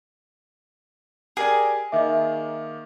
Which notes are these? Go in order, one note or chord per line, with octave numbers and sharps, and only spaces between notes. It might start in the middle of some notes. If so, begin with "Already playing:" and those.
G4 G#4 A#4 D5
D#3 A#3 D#5 E5 D6